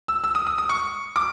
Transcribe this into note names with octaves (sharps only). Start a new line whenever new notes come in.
E6
E6
D#6
D#6
D#6
C#6
D6